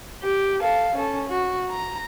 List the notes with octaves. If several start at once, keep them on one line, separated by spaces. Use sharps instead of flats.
G4
A4 F5
C#4 A4
F#4
A#5